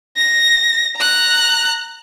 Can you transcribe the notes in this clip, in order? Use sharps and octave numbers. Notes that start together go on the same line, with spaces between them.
A#6
A#5 F#6